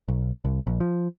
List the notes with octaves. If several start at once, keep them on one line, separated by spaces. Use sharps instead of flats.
B1
C2
A#1
F3